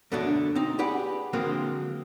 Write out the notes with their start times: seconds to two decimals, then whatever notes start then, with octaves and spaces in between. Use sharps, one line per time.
0.12 F#2 B2 D3 F#3 A3 D4
0.55 C4 D#4
0.79 G4 G#4 B4 D5 F#5
1.33 D3 F3 F#3 G#3 A#3 C4